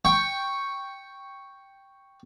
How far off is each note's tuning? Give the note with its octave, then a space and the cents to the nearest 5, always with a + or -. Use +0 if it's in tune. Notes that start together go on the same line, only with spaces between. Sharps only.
G5 +0 C#6 +0